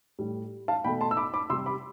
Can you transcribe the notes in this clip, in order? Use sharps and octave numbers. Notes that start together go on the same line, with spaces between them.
A2 G3
F5 A5
B2 A3 G5 B5
A5 C6
E6
B5 D6
B5 D6
C3 G3 C6 E6
B5 D6